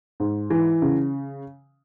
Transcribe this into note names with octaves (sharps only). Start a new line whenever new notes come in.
G#2
E3
C#3